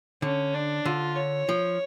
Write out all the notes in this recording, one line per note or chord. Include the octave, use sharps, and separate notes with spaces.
D3 C#4
D4
D3 F4
C#5
F3